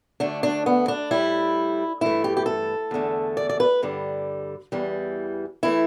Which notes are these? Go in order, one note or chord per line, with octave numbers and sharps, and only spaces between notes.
D2 D3 A3 D4
D4
B3
D4
A2 G3 E4
G2 E3 A3 E4
G4
G4
A4
E2 D3 A3
D5
D5
B4
G2 D3 G3
E2 E3 G3
E3 A3 E4